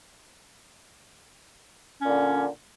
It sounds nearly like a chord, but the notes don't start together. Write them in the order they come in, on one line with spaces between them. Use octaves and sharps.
C#4 A#2 D3